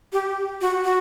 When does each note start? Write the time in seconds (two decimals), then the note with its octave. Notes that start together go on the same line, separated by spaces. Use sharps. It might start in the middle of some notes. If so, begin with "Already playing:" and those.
0.13 G4
0.61 F#4
0.85 F#4